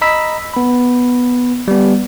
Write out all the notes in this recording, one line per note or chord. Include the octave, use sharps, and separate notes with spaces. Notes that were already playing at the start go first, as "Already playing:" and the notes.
D#5 A#5 B5 E6 B6
B3 B5
G3 B3